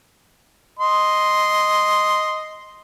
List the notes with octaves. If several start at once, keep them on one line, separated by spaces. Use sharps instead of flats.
D#5 C6